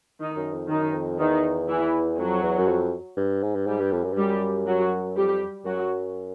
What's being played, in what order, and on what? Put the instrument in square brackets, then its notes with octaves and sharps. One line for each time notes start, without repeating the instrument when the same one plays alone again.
[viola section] D#3 D#4
[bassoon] F#2
F2
[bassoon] F#2 [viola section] D#3 D#4
[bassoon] F2
[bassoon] E2 [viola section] D#3 D#4
[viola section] E3 E4
[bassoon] F2 [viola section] F#3 F#4
[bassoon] E2
F#2
F2
G2
G#2
G2
[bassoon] G#2 [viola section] G3 G4
[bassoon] G2
F2
F#2
G2
[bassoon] F#2 [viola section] G3 G4
[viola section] F#3 F#4
[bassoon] F2 [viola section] G3 G4
[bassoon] F#2 [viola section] F#3 F#4